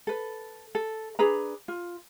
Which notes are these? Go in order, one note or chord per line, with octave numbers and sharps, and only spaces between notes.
A4 B4
A4
D4 G#4 B4 A#5
F4